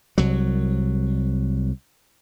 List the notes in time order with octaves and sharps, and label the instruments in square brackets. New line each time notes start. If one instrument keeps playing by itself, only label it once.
[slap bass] C2 F#3